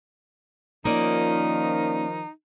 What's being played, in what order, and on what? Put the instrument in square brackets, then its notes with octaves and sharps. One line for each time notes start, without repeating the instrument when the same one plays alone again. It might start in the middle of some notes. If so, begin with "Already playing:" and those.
[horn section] D#3 F3 [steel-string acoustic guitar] A#3 C#4 D5 [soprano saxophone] D#4